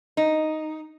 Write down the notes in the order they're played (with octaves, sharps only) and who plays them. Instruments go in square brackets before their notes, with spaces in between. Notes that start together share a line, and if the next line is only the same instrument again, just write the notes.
[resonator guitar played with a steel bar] D#4